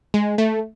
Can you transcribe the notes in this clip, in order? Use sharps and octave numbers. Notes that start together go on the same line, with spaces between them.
G#3
A3